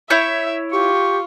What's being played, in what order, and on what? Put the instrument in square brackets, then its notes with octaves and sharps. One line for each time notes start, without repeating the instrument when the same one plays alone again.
[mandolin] E4 C#5 G6 [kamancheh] E5
[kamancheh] F4 [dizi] G4 [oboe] C#6